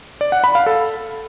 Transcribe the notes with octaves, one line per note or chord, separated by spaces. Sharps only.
D5
F#5
B5
F5
A4